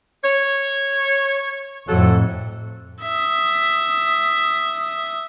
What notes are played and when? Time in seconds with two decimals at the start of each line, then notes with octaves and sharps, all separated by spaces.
0.24 C#5
1.87 F2 A2 F#3 A4
3.02 E5 D#6